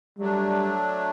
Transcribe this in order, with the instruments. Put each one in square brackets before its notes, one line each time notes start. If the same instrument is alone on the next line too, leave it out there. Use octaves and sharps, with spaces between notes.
[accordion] F#3 A3 D4 [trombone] G3